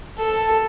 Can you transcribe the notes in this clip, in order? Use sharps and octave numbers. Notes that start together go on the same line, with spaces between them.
A4